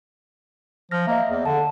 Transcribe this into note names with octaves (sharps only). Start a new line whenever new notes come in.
F3 F6 A#6
A#3 D#5 E5
E2
D3 A5